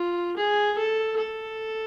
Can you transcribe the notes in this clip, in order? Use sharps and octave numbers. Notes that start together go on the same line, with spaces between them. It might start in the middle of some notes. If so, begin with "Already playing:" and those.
Already playing: F4
G#4
A4
A4